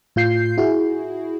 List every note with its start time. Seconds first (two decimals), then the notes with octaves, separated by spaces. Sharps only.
0.16 A2 F4 G6 C7
0.58 E4 F#4 G#4